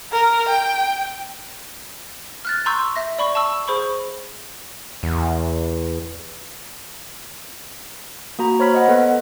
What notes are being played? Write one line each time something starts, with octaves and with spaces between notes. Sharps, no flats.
A#4
G5
F6 F#6 A6
A#5 C6 C#6 E6 G6
E5 A#6
D5 B5 C#6
A5 C#6 E6
G#4 C5 B5 C#6
E2
A#3 F#4 A#5
C5 C#5 B5 F6 B6
D#5 F#5
B3 A4 B4